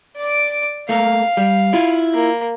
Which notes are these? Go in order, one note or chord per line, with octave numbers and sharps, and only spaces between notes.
D5 D6
A3 A#3 F5
G3
E4 F4
A#3